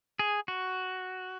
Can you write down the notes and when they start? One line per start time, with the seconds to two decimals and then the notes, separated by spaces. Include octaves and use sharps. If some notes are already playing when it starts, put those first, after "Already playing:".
0.19 G#4
0.48 F#4